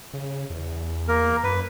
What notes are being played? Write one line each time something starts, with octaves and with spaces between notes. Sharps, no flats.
C#3
E2
A#3 A#4
F#2 B4